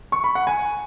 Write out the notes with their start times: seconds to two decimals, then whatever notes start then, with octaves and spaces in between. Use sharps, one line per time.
0.12 C#6
0.24 B5
0.35 F#5
0.47 G#5